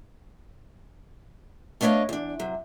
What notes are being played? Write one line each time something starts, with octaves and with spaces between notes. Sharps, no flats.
A3 B3 D4 C#5 D#5 F5
E2 D4
C3 F#3